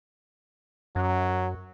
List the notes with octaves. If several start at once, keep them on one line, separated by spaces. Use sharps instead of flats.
F#2 F#3